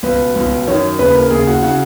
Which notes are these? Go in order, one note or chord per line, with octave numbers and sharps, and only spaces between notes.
C#2 B2 B4
C#2 B2
F#2 D#3 C#5
D#2 C#3 B4
A#4
D#2 C#3 G#4
F#4
C#3 F#4